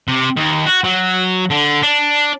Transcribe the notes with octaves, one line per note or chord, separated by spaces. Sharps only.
C3
D#2
F#4
F#3
D3
D4